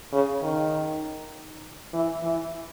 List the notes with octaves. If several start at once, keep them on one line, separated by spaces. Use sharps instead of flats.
C#3
D#3
E3
E3